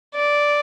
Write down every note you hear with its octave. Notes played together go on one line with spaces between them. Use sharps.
D5